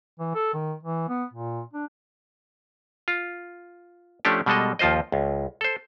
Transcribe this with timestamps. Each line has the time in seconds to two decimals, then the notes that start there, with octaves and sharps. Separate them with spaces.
0.19 E3
0.35 A4
0.54 D#3
0.83 E3
1.09 B3
1.34 A#2
1.73 D4
3.08 F4
4.25 F3 A3 C#4 D4 G4
4.46 B2 G3 G#3 A4 D#5
4.79 D#2 F3 F4 C5 D#5
5.12 C#2
5.61 A4 C5